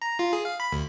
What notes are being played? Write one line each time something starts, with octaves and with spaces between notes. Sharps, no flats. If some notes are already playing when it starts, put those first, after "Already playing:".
A#5
F4
G#4
F5
B5
D2